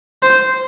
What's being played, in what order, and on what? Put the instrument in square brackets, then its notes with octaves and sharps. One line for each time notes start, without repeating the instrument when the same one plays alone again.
[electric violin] C5